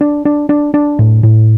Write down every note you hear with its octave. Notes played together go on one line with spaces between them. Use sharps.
D4
D4
D4
D4
A2
A2